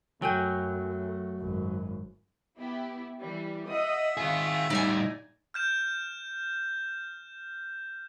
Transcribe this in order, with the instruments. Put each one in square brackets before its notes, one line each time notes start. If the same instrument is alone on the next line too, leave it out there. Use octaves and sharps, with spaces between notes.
[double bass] F#2 [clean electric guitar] F#3 [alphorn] A3 [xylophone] G5 G#5 G6
[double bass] G#1 F#2
[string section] B3 E4 G4
E3 G3
[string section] D#5 F#5 D#6 [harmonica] E5
[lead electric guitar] D#3 G#4 [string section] F4 C#6
[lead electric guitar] A2 G3 [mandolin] D#4 G#5 [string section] D5
[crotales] F6 G6 E7